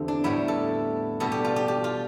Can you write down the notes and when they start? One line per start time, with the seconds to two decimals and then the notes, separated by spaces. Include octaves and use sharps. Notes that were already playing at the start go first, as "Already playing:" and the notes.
Already playing: E2 D3 C4 G4 A4
0.08 D4
0.24 A2 G3 B3 E4
0.48 A4
1.20 B2 G3 B3 A4
1.32 G4
1.45 F4
1.56 G4
1.68 G4
1.84 F4